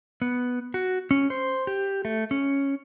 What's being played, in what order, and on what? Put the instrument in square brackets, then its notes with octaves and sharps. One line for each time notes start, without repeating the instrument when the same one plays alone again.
[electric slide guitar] B3
F#4
C#4
C5
G4
A3
C#4